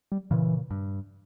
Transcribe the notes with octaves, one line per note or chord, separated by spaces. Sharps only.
G3
A#2 C#3 E3
G2